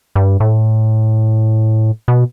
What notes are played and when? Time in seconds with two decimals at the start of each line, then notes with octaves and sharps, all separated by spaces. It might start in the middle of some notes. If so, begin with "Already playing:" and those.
0.16 G2
0.40 A2
2.08 B2